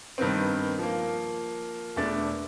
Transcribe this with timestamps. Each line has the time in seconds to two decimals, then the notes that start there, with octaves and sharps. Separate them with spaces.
0.18 G2 D#3 B3 C4
0.79 F3 A#3
1.96 E1 A3 B3 D4 A5 A6